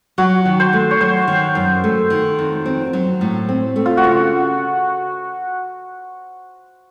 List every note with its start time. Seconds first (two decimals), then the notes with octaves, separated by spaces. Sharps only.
0.18 F#3 F#4
0.45 D#3
0.60 C5
0.73 A3
0.91 C#5
1.01 F#3 C5
1.28 D#3
1.55 F#2
1.84 A3
2.10 D#3
2.39 F2
2.66 C4
2.93 F#3
3.21 A2
3.49 C4
3.76 A3
3.86 F4
3.97 F#4
4.04 C#3